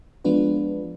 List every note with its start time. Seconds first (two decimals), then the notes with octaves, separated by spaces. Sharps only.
0.24 F3 G#3 B3 D4 F4 B4